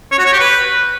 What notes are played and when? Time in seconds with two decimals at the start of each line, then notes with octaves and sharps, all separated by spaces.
0.12 C#5
0.19 F#4
0.26 C#5
0.33 G4
0.40 B4